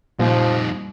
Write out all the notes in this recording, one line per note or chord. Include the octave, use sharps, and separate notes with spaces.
F2 A#2 F3 G3 A#3 D#4